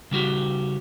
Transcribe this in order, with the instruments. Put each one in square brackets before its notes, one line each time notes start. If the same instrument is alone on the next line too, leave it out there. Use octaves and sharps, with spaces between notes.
[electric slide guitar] C#3 G3 F#4 G4